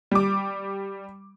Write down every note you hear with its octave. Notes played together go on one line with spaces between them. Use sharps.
G3 D6